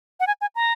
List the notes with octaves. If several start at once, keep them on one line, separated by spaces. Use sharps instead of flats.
F#5
G#5
G#5
A#5